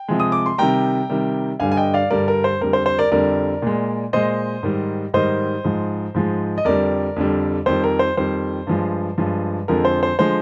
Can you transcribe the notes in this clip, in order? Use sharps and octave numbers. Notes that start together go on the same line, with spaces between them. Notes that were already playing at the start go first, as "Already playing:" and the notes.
Already playing: G5
C3 F3 G#3
D#6
D6
C6
C3 D#3 G3 G5 A#5
C3 D#3 G3
G2 D3 G3 F5 G#5
G#5
D#5 G5
D5 F5
G2 D3 G3 A#4 D5
A#4
C5
F2 D3 G3 A#4
C5
C5
A#4 D5
F2 D3 G3 A#4 D5
A#2 G#3
A#2 G#3 C5 D#5
G#2 D#3 G3
G#2 D#3 G3 C5 D#5
G#2 F3 G#3
G#2 F3 G#3
D#5
F2 D3 G3 A#4 D5
F2 D3 G3
F2 D#3 G3 C5
A#4
C5
F2 D#3 G3 C5
G2 F3 G#3
G2 F3 G#3
F2 D3 F3 G#3 A#4
C5
C5
D3 F3 G#3 C5